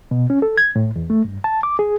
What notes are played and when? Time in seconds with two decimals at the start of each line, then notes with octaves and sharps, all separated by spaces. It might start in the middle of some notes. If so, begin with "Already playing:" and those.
0.11 B2
0.30 C#4
0.42 A4
0.57 G#6
0.76 A2
0.96 E2
1.10 A3
1.25 G2
1.44 A5
1.63 D6
1.79 G#4